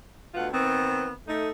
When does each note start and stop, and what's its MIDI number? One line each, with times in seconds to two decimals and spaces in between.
0.34 0.47 38
0.34 0.47 47
0.34 0.47 65
0.34 0.47 78
0.52 1.11 51
0.52 1.11 59
0.52 1.11 60
1.26 1.50 57
1.26 1.50 63